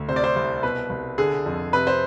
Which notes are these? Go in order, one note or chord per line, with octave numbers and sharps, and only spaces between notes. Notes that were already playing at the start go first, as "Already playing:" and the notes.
Already playing: D2
C3 C5
D5
C5
C2
B2 B4
C2
D3 G#4
F2
C3 B4
C5